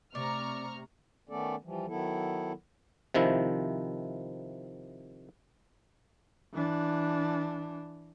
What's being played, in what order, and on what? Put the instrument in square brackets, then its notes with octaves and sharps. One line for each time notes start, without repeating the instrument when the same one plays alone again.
[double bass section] C3 [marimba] A3 C4 [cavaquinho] D5 [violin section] A#5 C#6 F6
[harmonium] D#3 A3 B3 C#4 A4 D5
E3 F3 G3
D#3 F#3 B3 E4 A4
[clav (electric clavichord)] C3 D#3 F3 E4
[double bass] E3 D4